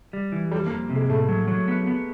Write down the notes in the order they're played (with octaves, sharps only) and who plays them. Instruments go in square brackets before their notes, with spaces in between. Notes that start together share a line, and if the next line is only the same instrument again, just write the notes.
[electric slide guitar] G3
E3
[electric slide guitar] F2 [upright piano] G3
[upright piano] A#3
[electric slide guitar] F2
C3
[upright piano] G#3
[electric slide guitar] A2 [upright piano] A3
[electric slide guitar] F#3
F#3
B3
B3